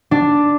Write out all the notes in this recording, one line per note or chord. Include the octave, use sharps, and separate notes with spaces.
D4